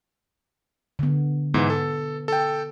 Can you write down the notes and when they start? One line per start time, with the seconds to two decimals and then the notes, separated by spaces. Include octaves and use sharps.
0.99 D3 B3
1.54 G#2 E3 B3
1.70 A4
2.28 A4 G5